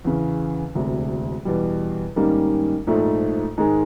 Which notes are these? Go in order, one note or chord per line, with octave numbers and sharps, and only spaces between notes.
E2 C#3 E3
E1 D2 C3
E2 B2 G3
G#2 D#3 G3 A#3 C#4
A#1 G#2 F3 A3
G#2 D#3 G#3